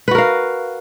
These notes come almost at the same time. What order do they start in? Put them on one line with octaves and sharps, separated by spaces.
B4 F#4 A#4 F5